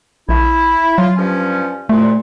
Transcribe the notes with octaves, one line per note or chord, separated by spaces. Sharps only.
A#1 E4
F#3 F4
G2 F3 C#4
C2 A#2 A3